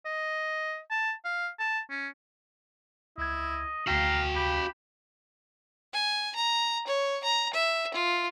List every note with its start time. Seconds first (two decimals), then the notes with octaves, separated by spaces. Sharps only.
0.05 D#5
0.91 A5
1.25 F5
1.60 A5
1.90 C#4
3.18 C#2 E4 D#5 G#6
3.87 D2 F#4 F5 G5 A#5 B6 C7
4.36 G4 B5
5.94 G#5
6.35 A#5
6.87 C#5
7.24 A#5
7.54 E5
7.94 F4